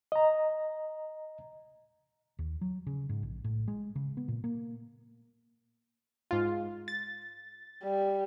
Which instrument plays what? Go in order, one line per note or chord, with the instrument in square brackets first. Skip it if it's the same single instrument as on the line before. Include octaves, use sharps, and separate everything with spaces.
[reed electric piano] D#5 A#5
[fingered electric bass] D#2
F#3
C#3
G#2
A#1
A2
G#3
C#3
B3
A#2
A#3
[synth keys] G#2 F4
A6
[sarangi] G3